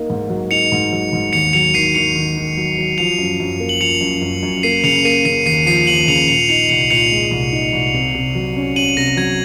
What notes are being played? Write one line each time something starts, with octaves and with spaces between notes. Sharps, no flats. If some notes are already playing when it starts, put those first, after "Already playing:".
Already playing: A#3 D#4
G#2
F#3
D#4 C#7 F7
G#2
F#3
G#2
D#2 C#7 F7
F#3 C#7 F7
D#3 C7 D#7
D#3 C#7 F7
D#3
D#3
F#3
F#3
F3 C#7 F7
F#2
F#2
A#3
F#7
F3 C#7 F7
F#2
F#2
F#2
A#3 C7 D#7
C#3 C#7 F7
A#3 C7 D#7
C#3 C7 D#7
D#2 C7 D#7
F3 C7 D#7
D#2 D#7 F#7
C#3 C#7 F7
A#2 C#7 F7
D#4 C#7 F7
C2 C#7 F7
A#2 C#7 F7
G#3
C2
D#4
C2
C3
C3
F#3
C#4
C#4 D#7 F#7
C3 A#6
F#3 G#6